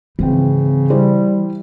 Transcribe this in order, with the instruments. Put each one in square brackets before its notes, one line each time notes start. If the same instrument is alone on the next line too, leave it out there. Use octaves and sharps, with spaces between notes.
[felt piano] G#1 C4 G5 [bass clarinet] C#3 [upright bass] E3
[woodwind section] G3 [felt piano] E4 C5